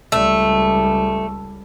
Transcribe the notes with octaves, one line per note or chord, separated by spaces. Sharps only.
C#2 G3 A3